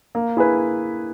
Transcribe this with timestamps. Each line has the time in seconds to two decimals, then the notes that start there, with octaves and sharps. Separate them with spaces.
0.15 A#3
0.37 E4 G#4 B4